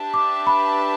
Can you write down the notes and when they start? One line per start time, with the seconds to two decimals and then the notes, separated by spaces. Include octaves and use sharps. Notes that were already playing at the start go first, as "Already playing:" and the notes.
Already playing: D4 G4 B4 E5 A5
0.14 D6
0.47 B5